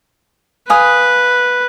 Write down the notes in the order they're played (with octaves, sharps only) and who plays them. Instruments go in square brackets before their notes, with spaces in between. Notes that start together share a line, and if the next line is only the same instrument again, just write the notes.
[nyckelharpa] B4 [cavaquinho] F5 G#5 D#6